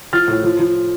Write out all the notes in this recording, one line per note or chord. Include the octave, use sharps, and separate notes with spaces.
F3 F6 A6
A2
F3
F3